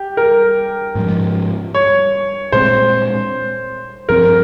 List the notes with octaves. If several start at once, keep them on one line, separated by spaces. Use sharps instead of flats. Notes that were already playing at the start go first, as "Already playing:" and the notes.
Already playing: G4
A#4
G#2 F3 G#3
C#5
A#2 G#3 C4 C5
G2 F3 C4 A#4